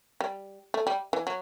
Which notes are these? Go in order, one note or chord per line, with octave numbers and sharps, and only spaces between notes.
G3
A3
G3
E3
F#3